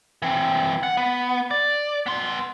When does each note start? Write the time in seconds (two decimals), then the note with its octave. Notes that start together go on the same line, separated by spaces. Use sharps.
0.22 E3 C4
0.83 F#5
0.97 B3
1.51 D5
2.06 B3 C6